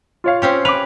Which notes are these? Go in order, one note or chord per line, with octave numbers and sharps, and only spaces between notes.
F4 C#5 F5
C4 C#4 G4
B4 D6 F7